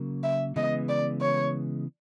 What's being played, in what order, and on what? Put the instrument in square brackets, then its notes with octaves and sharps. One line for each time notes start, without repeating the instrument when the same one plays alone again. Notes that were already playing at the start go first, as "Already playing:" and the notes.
Already playing: [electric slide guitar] C#3 F#3 A#3
[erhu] E5
[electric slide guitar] C#3 E3 G#3 B3 [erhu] D#5
[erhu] D5
C#5